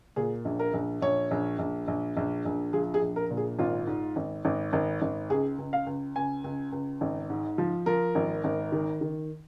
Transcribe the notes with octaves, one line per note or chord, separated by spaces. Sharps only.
A#2 G#4
A#1
A#4
A#1
A#1 C#5
A#1
A#1
A#1
A#1
A#1
F3 G#4
G#4
A#1
A#4
A#2
G#4
G#1 F4
G#2
G#1
G#1
G#1
G#1
C#2 G#4
C#2
F5
C#2
C#2 G#5
C#2
C#2
G#1
G#2
F3
F3 A#4
G#1
G#1
D#3
D#3